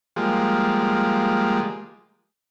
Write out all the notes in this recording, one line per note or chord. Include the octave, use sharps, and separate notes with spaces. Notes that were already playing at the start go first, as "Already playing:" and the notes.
F3 G3 G#3 A#3